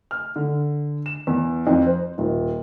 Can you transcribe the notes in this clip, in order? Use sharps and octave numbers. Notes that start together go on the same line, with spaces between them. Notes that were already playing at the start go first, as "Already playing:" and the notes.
F6
D3
E7
E2
F2
C5
D#1